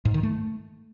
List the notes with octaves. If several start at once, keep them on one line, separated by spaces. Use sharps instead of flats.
G#2
D#3
A3